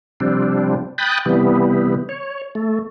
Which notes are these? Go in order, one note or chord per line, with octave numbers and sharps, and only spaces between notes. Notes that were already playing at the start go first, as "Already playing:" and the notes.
C3 F3 G3 C4 D4
G5 B5 D#6 F#6 G6 A6
C3 E3 G3 B3
C#5
A3